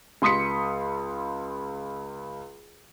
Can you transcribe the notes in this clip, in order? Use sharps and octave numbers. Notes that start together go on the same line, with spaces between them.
C#2 C6 D#6 B6 C#7